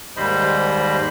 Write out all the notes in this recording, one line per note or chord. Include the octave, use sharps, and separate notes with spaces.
D#2 G#2 G3 C5 D#5 B5